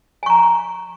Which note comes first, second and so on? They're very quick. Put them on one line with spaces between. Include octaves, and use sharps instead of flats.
G#5 C#6 A#5